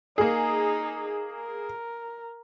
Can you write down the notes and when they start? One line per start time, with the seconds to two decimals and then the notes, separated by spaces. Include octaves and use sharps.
0.18 A#3 D#4 G#4
1.34 A#4